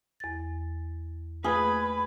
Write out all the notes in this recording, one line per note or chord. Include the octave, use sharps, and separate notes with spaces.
E2 A6
A3 F4 G#4 B4 B5 D#6